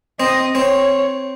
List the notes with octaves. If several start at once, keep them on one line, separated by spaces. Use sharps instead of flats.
C4 D#5
C4 C#5